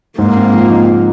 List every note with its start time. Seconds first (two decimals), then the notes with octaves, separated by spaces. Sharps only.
0.18 G#2 A#3
0.36 C4
0.53 F3
0.71 D#4